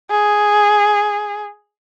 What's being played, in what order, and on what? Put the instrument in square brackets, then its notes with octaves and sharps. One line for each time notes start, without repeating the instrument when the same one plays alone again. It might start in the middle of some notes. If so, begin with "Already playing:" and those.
[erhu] G#4